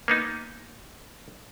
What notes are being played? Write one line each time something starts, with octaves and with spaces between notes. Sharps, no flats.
A#3 B3 D#4